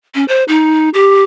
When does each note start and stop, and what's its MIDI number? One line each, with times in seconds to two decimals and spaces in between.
0.15 0.25 61
0.28 0.44 72
0.48 0.89 63
0.94 1.23 67